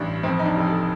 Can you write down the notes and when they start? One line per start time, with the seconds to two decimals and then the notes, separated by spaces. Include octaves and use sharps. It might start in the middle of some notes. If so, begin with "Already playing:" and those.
Already playing: A1 G2 D4
0.23 F2 C4
0.39 D#4
0.45 D4
0.56 F1
0.67 A4